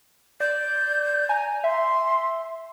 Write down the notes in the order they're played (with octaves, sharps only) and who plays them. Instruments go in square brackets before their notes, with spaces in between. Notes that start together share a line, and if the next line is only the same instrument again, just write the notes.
[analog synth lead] D5 [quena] G6
[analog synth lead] G#5 [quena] A#5
[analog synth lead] E5 [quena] C6